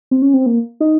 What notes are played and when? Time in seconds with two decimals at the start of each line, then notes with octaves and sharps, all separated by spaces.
0.11 C4
0.22 C#4
0.34 C4
0.46 A#3
0.81 D#4